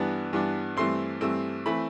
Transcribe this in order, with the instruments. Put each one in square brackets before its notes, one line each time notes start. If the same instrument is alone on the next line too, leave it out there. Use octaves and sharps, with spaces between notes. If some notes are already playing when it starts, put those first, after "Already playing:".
Already playing: [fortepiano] G2 E3 B3 D4
G2 E3 B3 D4
G2 E3 A3 C4 C6
G2 E3 A3 C4
E3 A3 C4 B5